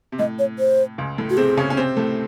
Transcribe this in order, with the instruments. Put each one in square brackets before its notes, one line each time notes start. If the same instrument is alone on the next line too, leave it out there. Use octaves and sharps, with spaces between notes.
[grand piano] C3
[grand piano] A2 [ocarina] D#5
[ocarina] C#5
C5
[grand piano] C#2 C#3
A2 A3
[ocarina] F#4
[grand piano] C3 C4 [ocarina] G#4
[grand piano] C#3 C#4
C#4
C3 C4
A2 A3